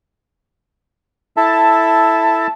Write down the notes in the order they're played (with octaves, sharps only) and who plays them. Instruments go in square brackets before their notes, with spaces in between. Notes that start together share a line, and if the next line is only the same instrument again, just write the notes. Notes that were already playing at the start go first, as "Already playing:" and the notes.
[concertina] E4 A4 E5 [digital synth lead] A5